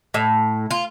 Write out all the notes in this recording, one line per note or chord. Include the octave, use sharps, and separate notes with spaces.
A2
F4